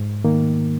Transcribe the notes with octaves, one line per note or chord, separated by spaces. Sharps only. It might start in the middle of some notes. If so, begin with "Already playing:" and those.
Already playing: G#2
D#3 A#3